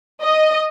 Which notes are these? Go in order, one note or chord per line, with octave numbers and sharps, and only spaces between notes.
D#5